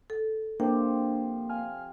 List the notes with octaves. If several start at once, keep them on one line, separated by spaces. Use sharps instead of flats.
A4
C3 F3 A#3 D4 G5
F5 G#5 F6